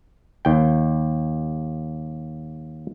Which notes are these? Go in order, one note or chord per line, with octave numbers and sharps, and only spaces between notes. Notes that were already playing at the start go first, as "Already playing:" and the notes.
D#2 G5